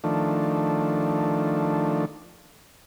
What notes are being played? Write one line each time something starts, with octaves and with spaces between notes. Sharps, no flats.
D#3 F3 A3 D4